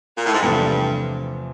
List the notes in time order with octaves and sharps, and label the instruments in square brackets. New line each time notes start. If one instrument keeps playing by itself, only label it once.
[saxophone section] A#2
A2
G#2
[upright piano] E2 C3 F3 A3 C4 [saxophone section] G2